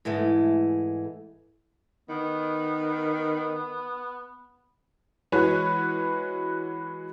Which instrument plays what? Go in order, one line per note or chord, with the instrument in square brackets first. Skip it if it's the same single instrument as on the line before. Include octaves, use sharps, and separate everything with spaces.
[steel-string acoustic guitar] G#2 E3 G#3 A3
[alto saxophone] D#3 [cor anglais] B3
[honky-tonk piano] E3 G#3 F#4 B4 C#5